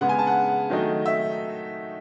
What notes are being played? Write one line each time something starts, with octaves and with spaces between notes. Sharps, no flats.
C#3 G#3 B3 F#5
G#5
A5
F#5
D#3 F#3 A3 D#4
E5